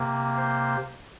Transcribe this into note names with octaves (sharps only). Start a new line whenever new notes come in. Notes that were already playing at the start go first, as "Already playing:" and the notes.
Already playing: C3 A#3
C5